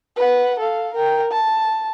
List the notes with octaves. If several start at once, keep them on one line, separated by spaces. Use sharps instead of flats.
B4 F#5
A4 F5
A#4 G5
A5